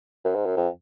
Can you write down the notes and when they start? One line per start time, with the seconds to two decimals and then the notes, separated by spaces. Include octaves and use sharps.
0.24 F#2
0.35 G#2
0.46 F#2
0.57 F2